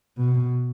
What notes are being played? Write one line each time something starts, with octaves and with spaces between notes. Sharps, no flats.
B2